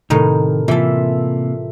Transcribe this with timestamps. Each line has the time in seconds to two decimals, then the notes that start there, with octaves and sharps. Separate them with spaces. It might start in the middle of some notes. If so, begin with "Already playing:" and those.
0.10 A2 C3 D#3 D#4 A#4
0.68 C3 E3 A#3 F4 A4 E5